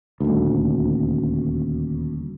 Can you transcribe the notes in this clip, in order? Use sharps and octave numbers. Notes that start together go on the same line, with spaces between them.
D#1 D2